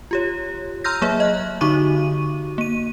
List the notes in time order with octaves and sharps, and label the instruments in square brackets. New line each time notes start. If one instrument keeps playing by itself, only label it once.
[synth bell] F4 G4 C#5
A#5 C6 E6 F6 G6 A#6
F#3 A#3 G#4 C#5 E5
D#5 F6 F#6
D3 D#4 F#4 C#6 D6 D#7
A#3 D#7